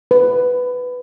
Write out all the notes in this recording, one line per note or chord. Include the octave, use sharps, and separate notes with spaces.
B4